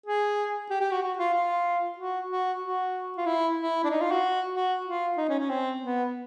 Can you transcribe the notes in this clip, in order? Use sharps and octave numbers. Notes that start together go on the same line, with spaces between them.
G#4
G4
G4
F#4
F#4
F4
F4
F#4
F#4
F#4
F4
E4
E4
D4
D#4
F4
F#4
F#4
F4
D#4
C#4
C#4
C4
B3